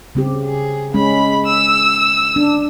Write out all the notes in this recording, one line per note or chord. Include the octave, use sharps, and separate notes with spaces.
C#3 C4 G4
G#4
G#3 C#4 B5
E6
D4